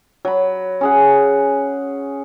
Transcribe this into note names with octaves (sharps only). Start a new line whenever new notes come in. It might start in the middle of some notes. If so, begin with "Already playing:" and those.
F#3 B5
C#4 G#4 F#5